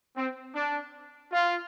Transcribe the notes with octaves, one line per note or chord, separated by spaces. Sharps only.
C4
D4
F4